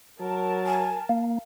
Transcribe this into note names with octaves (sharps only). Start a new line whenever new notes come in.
F#3 A#4 A5
G#5
A#3 F5